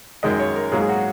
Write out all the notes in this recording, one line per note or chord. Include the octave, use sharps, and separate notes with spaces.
F#2 D#3 G#3 D#5
C#5
A#4
G#2 F#3 A#3 G#4
G#4
F#4